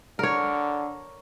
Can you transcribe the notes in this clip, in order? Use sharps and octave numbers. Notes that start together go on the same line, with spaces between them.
D3 A#4 C#5